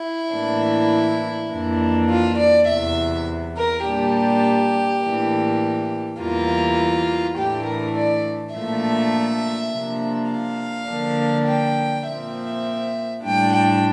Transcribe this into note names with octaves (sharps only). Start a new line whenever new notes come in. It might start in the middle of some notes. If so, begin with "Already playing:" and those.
Already playing: E4
A2 E3 A#3 D4
F2 E3 A#3 D4
F4
D5
E2 C3 E3 E5
A#4
A#2 G3 D4 G4
A2 E3 A#3 D4
E2 E3 G3 A#3 F4
A2 E3 A3 D4 G4
A#4
D5
A#2 F3 A3 D4 E5
C3 F3 A#3 D4
F5
D3 F3 A#3 D4
G5
A#2 F3 C4 E5
A2 G3 D4 G5
G5